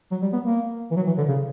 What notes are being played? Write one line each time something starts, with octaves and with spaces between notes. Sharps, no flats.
F#3
G3
B3
A#3
E3
F#3
E3
D3
C#3